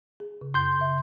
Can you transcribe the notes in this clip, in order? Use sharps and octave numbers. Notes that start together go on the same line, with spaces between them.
G#4
C#3
F#2 C6 G6
C#3 E5